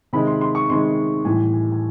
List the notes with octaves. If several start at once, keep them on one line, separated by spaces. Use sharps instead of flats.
C3 D#3 G#3 B5
C6
C6
C#6
C3 D#3 G#3 C6
A2 E3 G3 G#5
G#5
G#5